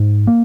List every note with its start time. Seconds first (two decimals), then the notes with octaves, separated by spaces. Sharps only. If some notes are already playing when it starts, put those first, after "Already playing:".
Already playing: G#2
0.27 A#3